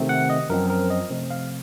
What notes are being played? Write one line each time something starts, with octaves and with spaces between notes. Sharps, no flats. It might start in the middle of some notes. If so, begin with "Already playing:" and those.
Already playing: C3 D#3 A3 C4
F#5
D#5
F#2 F3 C4 A#4
A#4
D#5
C3 F3 A3 C4
F5